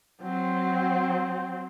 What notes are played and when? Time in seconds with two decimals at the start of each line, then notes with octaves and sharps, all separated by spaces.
0.22 F#3 C4